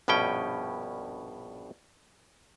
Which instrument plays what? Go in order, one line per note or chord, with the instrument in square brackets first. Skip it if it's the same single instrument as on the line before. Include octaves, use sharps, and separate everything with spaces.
[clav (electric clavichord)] A#1 G2 B2 C#4 G5